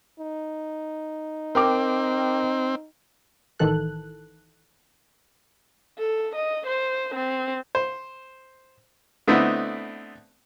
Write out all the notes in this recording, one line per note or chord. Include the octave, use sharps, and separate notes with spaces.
D#4
C4 A#4 G5 D6
A1 D#3 E3 A4 F#6
A4
D#5
C5
C4
C5
D3 A3 B3 C4 D#4 E4